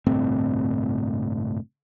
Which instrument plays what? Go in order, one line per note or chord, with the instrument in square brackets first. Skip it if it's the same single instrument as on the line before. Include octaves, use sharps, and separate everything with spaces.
[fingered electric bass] G1 C2 A2 C4